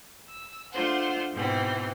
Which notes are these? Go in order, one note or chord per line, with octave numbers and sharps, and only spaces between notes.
E6
A3 D4 F4 C5 F#5
G#2 B2 E3 C4